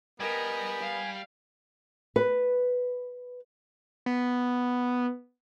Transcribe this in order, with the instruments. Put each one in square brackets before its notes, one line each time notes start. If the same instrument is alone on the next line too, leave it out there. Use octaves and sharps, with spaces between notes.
[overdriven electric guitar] G3 [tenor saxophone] B3 [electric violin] A#4 D#5 [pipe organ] G#5 B5 G#6
[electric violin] F5
[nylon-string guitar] B4
[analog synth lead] B3